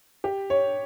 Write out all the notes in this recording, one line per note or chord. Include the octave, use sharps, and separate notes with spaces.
G4
C#5